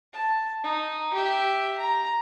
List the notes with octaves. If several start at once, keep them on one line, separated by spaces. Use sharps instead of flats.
A5
D#4
G4 E5
A#5